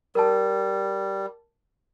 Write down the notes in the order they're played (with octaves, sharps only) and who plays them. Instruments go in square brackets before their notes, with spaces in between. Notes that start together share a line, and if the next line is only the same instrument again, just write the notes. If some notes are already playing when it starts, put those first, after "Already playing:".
[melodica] G3 [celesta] A#4 A5